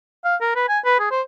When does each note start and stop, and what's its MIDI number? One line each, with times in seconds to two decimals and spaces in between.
0.25 0.36 77
0.41 0.55 70
0.56 0.66 71
0.69 0.79 80
0.85 0.98 71
0.99 1.11 68
1.11 1.22 72